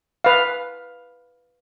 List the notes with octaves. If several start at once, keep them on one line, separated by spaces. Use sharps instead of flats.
B4 F5